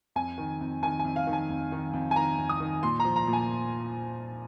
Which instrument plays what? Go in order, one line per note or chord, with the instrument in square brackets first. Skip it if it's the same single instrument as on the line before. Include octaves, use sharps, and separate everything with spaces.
[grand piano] F2 G#5
D#3
F2
D#3 G#5
G#5
F2
F5
D#3
G#5
F2
D#3
F2
G#5
D#3 A#5
F2
D#6
D#3
A#2 C6
A#5
F3
A#5
A#2
G#5